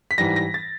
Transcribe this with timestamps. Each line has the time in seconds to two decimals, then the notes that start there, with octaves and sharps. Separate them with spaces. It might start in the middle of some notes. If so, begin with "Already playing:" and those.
0.11 B6
0.18 G#2 E3 G3 A#6
0.36 A#6
0.54 A6